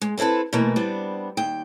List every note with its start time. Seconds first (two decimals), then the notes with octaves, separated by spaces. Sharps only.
0.02 G#3
0.17 B3 C4 E4 A4 B4
0.53 B2 E3 A3 A#3
0.76 G3 B3 C4 D4
1.37 D#2 G5